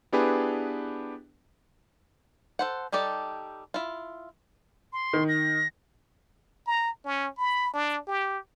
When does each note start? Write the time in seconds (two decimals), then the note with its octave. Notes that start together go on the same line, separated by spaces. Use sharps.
0.12 B3 D4 E4 G4 G#4 B4
2.59 A4 C5 F#5
2.92 G3 D#4 G4 A4 D5
3.74 E4 F4
4.93 C6
5.13 D#3
5.28 A#6
6.67 A#5
7.05 C#4
7.38 B5
7.74 D4
8.07 G4